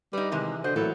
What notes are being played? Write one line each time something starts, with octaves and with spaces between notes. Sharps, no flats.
G3 D#4 B4
C3 D#3 E3 G#3
D3 F#4 C5 D#5 F#6
A2 E3 F#3 A#3 E4 A4